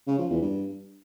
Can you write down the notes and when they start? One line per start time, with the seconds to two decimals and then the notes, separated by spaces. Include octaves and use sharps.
0.07 C#3
0.18 F3
0.30 E2
0.42 G2